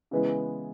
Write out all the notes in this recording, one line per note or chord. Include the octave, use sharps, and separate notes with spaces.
C#3 E3 G#3 B3 E4